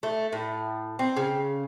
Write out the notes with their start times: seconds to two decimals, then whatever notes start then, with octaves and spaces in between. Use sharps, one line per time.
0.03 A3
0.33 A2
0.99 C4
1.17 C#3